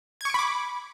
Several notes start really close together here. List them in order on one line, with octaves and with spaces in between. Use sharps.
G#6 C#6 D7 B5 D6